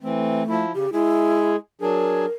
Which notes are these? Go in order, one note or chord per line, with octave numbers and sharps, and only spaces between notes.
E3 A3 C4
F3 E4
C#3 G4
G#3 E4 G#4
F#3 D4 G#4 A#4